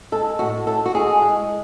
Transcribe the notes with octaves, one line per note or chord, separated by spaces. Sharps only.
G#3 A4
A2 F#4
A2 A4
F#4
G#3 G#4
G#3